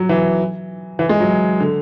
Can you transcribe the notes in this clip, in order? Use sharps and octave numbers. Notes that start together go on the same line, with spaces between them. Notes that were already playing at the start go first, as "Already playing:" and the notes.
Already playing: F#3
E3
E3
G#3
F#3
D3